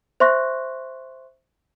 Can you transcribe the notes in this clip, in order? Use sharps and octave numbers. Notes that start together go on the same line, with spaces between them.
C5 E5 C6 C#6 F#6 A#6